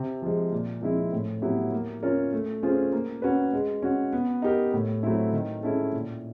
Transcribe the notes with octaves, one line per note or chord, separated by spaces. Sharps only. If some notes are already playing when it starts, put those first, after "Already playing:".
Already playing: C3
F3 G#3
A#2
F3 G#3 C4 E4
A2
F#3 B3 E4 G4
A#3
C#4 F4 A#4 C#5
A3
C#4 F4 G#4 C5
A#3
C#4 F#4 B4
G#3
C#4 F#4
B3
D#4 G4 A#4
A2
F#3 A3 C4 E4
D#3
G#3 C#4 E4 A4
A#2